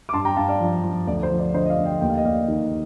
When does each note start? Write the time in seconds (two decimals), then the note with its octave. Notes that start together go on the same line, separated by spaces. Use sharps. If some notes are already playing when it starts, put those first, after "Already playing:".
0.09 D6
0.13 G2 A5 C6
0.25 G5 A#5
0.37 G2 F5 A5
0.48 D5 F5
0.60 F3
0.84 F3
1.07 D2 D5
1.23 C5
1.31 F3
1.39 D5
1.54 D3 C5 D#5
1.65 D#5
1.70 D5 F5
1.78 D2
1.85 D#5 G5
2.01 D#2 G5
2.09 F5
2.17 D#5
2.25 D#2 D5 F5
2.48 D#3